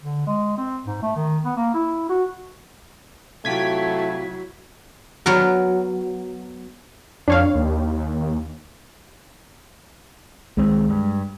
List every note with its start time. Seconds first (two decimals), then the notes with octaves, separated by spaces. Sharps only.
0.02 D3
0.27 G#3
0.58 C4
0.86 G#2
1.02 A3
1.17 D#3
1.44 B3
1.57 A#3
1.75 E4
2.09 F#4
3.45 C3 F#3 A3 E4 F4 G4 G#6 B6
5.26 F#3 B3 A#4
7.28 F2 D4 C#5 F5
7.55 D#2
10.57 C2 D#3 G#3 C4
10.89 G2